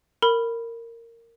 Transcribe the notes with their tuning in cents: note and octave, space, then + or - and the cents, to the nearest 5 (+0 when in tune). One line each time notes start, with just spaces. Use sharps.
A#4 -15 B5 +0